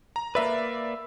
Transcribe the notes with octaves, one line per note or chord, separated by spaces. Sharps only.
A#5
A#3 B4 D5 E5